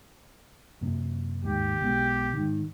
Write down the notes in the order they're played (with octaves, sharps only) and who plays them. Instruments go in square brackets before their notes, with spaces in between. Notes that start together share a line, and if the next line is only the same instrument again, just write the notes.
[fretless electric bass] F#2 C3 A#3
[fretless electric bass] D#2 G#2 [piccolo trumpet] G4
[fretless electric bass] B1 B2 G#3
G#2 D#3